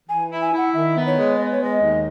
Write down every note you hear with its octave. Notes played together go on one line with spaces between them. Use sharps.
E3 G#5
E4
G#5
E4
F#5
D#3 E5
B3
C#5
G#3
B3 D#5
C#5
G#3 D#5
D#2